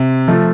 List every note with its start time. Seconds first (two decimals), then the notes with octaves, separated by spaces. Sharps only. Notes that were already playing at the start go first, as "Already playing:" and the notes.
Already playing: C3
0.28 F3 A3